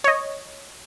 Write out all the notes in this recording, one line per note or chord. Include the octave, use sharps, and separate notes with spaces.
C#5 D#5